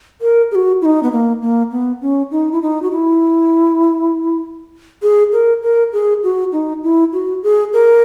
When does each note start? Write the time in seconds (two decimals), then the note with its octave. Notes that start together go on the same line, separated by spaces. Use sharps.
0.21 A#4
0.51 G#4
0.55 F#4
0.81 E4
0.85 D#4
1.03 B3
1.12 A#3
1.42 A#3
1.71 B3
2.01 C#4
2.31 D#4
2.52 E4
2.62 D#4
2.82 F#4
2.92 E4
5.02 G#4
5.33 A#4
5.63 A#4
5.93 G#4
6.23 F#4
6.52 D#4
6.83 E4
7.13 F#4
7.43 G#4
7.73 A#4